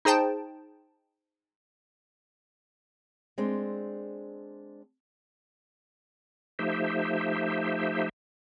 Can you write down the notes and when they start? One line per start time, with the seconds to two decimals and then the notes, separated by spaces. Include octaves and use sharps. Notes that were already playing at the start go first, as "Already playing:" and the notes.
0.05 D#4 G#4 C5 G5 A5
3.38 G#3 C4 D4
6.59 F3 A3 D#4 G4 C5 E5